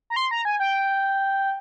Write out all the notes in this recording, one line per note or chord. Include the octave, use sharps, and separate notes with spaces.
A#5
C6
A#5
G#5
G5